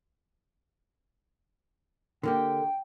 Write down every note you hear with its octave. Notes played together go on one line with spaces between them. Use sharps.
D3 A#3 G4 G5